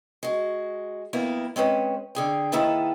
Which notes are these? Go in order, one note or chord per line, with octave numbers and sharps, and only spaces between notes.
G#3 F#4
F2 A#3 B3 E4
G#3 C4 C#4 B4
D3 G#4 G5
D#3 A#3 E4 G#4 A4 B4